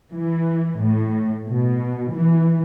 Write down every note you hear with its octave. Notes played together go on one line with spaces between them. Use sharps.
E3
A2
B2
E3